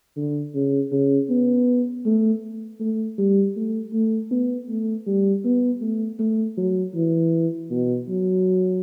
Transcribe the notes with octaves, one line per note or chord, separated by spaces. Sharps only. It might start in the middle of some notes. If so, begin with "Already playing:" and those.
D3
C#3
C#3
B3
A3
A3
G3
A3
A3
B3
A3
G3
B3
A3
A3
F#3
E3
B2
F#3